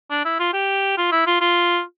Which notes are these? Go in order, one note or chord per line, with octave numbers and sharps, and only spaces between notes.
D4
E4
F4
G4
F4
E4
F4
F4